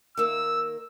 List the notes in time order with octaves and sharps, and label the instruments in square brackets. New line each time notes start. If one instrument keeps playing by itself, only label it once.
[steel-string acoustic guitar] D#3 A#3 [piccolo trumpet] E6